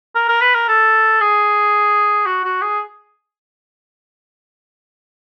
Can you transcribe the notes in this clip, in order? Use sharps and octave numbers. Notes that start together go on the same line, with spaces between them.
A#4
A#4
B4
A#4
A4
G#4
F#4
F#4
G#4